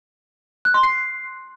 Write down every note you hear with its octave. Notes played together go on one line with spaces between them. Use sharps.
F#6
C6
C7